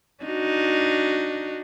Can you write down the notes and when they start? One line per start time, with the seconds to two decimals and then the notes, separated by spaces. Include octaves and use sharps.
0.24 D4 D#4 F#4